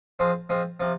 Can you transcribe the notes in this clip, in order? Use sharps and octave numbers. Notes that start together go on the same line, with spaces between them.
F3 G#3 C4
F3 G#3 C4
C3 F3